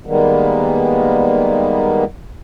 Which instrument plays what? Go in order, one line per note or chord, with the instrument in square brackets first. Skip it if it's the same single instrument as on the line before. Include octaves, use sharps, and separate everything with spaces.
[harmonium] D#3 G3 G#3 A#3 B3